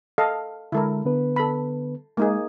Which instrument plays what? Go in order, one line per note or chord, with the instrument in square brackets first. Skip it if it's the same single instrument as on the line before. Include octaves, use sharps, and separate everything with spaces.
[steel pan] A4 D#5 F5
[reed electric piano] D3 G#3 [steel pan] E4 A4 A#4
[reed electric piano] D3 B3 B4
[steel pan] A4 B5
[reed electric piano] G#3 [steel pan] A#3 D#4 G#4